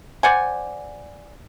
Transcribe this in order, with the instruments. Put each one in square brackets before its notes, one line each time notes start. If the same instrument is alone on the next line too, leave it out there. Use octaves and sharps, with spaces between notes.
[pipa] C5 D5 F#5 G#5